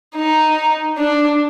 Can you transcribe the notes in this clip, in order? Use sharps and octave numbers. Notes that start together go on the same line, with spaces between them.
D#4
D4